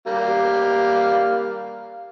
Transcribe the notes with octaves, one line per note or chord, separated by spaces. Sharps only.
G3 A#3 F5